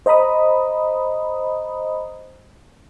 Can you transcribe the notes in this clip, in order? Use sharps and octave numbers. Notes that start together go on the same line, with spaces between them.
C5 D#5 A#5 B5 D#6